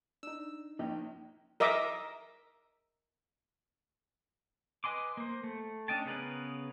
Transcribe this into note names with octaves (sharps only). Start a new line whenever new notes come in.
D4 D#4 E6
A#1 A#2 D#4 G5 A#5
A#4 D#5 E5 D6
B4 D#5 G#5 C6 D6
A#3 C5
A3
C#4 D4 D#5 G5 A5
C#3 B3 G#4 A#4 B4